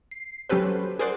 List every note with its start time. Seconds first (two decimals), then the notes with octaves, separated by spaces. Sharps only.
0.11 C7
0.49 F#3 C#4 G4 A4 B4 C5
0.99 G#4 A#4 C5 D5 F#5 D6